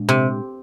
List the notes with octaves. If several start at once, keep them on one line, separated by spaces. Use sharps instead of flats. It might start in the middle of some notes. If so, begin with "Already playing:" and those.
Already playing: A#2 G#3 D4
C3